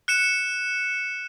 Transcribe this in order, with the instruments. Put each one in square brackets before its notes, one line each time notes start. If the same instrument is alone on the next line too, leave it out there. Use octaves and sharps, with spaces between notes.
[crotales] F#6 C#7 E7